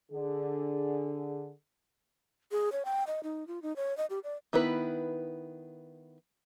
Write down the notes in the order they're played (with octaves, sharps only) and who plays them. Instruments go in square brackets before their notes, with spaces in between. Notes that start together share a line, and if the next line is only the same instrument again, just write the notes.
[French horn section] D3 G#4
[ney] G#4
C#5
G5
D#5
D#4
F4
D#4
C#5
D#5
G4
D5
[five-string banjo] D#3 B3 E4 B4